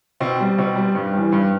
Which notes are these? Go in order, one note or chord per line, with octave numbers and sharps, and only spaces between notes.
B2 C4
G3
B2 C4
G3
G2
E3 G3
G2